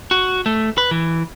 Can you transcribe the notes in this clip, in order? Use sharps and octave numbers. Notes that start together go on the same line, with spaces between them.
F#4
A3
B4
E3